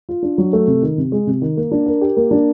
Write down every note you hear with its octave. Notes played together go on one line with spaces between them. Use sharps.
F4
D4
F#3
A3
C3
D#3
C3
G#3
C3
D#3
A#3
D4
A#4
G4
A#3
D4